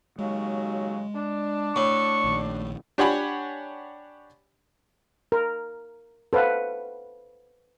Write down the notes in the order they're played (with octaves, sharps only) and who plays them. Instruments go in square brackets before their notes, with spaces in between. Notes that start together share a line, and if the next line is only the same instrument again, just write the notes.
[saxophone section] D#2 C#3 F#3 [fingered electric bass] G#3
[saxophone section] D4
[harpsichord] A2 [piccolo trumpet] C#6
[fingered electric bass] A#1 D#3
[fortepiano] D4 G4 C#5 F#5 G#5 B5
[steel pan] A#4
A4 B4 C5 F5 F#5